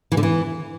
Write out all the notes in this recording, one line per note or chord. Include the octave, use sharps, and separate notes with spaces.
E3
D3
E3